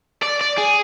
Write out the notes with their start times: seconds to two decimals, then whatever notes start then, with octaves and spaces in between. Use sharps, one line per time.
0.22 D5
0.41 D5
0.58 G#4